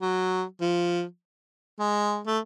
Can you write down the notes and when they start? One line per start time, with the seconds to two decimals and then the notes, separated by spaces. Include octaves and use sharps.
0.01 F#3
0.61 F3
1.79 G#3
2.27 A3